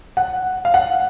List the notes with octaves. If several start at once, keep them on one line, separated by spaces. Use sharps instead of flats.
F#5
F5
F#5